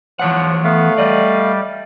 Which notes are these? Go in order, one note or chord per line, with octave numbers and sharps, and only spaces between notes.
E3 F3 C#5 F#5
A3 B3 F5
G3 D5 D#5